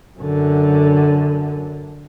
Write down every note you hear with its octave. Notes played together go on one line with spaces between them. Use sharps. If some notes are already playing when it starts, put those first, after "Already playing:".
F#2 D3